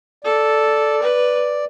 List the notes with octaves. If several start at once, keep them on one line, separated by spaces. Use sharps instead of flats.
A4 D5
B4